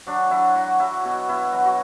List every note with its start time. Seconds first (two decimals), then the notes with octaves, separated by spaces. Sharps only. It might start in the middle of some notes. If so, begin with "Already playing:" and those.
0.07 F#3 D4
0.31 F#3 E4
0.55 F#3 F#4
0.80 F#3 E4
1.05 B2 F#4
1.29 B2 E4
1.52 F#3 F#4
1.65 F#4